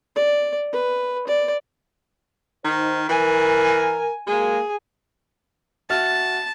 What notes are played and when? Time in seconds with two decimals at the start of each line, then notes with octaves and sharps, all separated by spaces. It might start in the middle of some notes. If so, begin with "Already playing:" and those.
0.16 D5
0.73 B4
1.27 D5
2.65 D#3 D#4 C5
3.09 E3 A#4 G#5
4.27 A#2 F#3 G#3 A#3 G#4
5.90 F#4 E5 A5 F6